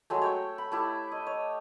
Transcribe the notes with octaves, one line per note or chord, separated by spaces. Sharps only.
F#3 G#3 A3
C#5 G5 C#6
B5
A3 E4 G4
D#5
C#5